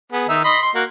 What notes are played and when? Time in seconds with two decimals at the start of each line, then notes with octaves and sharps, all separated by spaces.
0.12 B3 G#4
0.29 D#3 D#4 E5
0.44 D#5 B5 C6
0.62 C6
0.75 A#3 F#4